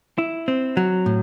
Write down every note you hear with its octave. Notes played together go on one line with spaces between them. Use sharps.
E4
C4
F#3
A2